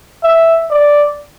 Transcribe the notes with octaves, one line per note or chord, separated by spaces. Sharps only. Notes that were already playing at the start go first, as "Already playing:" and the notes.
E5
D5